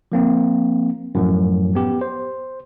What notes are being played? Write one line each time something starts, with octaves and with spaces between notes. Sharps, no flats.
F3 A#3 C4
F#2 A2 F3
B3 G4
C5